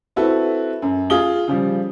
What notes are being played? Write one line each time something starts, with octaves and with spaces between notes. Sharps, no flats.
C4 E4 F#4 A4 B4
F#2
F4 G#4 D#6 G7
C#3 F3 G3